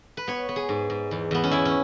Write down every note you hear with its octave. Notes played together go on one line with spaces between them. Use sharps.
B4
B3 C#5
B3
G#4
G#2
G#2
E2
E2 B3
C#4
E2 E4
C#4